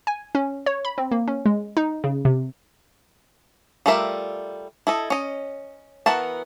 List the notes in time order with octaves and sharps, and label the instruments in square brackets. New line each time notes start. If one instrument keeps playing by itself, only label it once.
[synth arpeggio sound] G#5
C#4
C#5
B5
C4
A#3
C#4
G#3
D#4
C#3
C3
[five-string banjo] G3 A3 F4 A#4 E5
E4 A4 D#5
C#4 D#5
E3 B3 F#4 A#4 A5